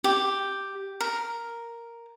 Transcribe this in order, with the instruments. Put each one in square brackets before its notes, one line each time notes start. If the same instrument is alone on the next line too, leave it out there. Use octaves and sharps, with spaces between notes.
[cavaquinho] G4
A#4